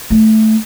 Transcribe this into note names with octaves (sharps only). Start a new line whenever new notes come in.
A3